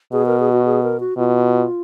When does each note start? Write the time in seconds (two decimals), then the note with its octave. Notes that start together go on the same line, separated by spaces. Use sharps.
0.13 B2 G#4
0.26 A#4
0.40 G#4
0.52 F#4
0.65 G#4
0.83 A#4
1.00 F#4
1.17 B2 F4